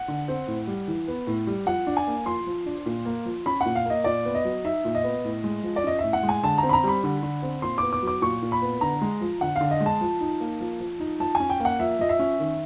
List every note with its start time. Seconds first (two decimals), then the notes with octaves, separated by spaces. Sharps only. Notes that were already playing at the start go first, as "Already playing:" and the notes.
Already playing: F#5
0.08 D3
0.28 C4
0.47 A2
0.67 G3
0.88 E3
1.08 B3
1.27 A2
1.47 G3
1.66 F3 F#5
1.87 D4
1.97 G#5
2.07 A#3
2.26 F3 C6
2.46 F3
2.66 D4
2.86 A#2
3.05 A#3
3.25 F3
3.46 C#4 B5
3.61 A#2 F#5
3.76 F5
3.85 A#3 D#5
4.04 A#2 D5
4.25 B3
4.35 D#5
4.45 F#3
4.65 D#4 E5
4.85 A#2
4.95 D#5
5.04 B3
5.24 A2
5.44 G#3
5.64 F3
5.76 D5
5.84 C#4 D#5
5.99 A2 E5
6.13 F#5
6.23 G#3
6.29 G#5
6.43 D3 A5
6.58 C4 A#5
6.69 B5
6.73 A#5
6.84 G3 B5
7.03 D3
7.23 D3
7.42 C4
7.62 A#2 C6
7.78 B3 D6
7.93 D6
8.02 F#3
8.07 D6
8.22 A#2 C#6
8.42 A#2
8.52 B5
8.62 B3
8.81 D3 A#5
9.01 G#3
9.21 F3
9.41 D3 F#5
9.56 D3 F5
9.71 D#5
9.80 G#3
9.86 A5
10.01 F3
10.21 D#4
10.40 A#3
10.60 F3
10.80 F3
11.00 D#4
11.20 F3 A5
11.35 G#5
11.40 C#4
11.50 G5
11.60 A#3
11.65 F#5
11.79 F3 E5
11.99 F3 D#5
12.09 E5
12.19 C#4
12.39 D#3